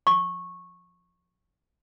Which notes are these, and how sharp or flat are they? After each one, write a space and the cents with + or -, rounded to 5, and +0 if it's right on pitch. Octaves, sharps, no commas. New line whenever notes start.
C#6 -15